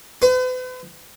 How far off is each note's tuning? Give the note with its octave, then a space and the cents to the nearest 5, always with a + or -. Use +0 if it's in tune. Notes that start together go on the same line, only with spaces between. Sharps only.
B4 +45